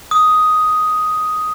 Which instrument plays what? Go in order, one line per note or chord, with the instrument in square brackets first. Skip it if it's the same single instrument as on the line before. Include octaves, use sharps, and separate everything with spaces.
[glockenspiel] D#6